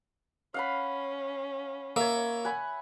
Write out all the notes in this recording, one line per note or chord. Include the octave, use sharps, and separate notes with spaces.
C#4 F5 F#5 B5
A#3 C#5 E5
F#5 G#5 B5